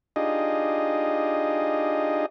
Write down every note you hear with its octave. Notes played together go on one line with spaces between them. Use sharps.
D4 D#4 F4 G4 G#4 D#5